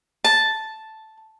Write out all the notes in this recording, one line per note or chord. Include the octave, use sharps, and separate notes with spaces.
A5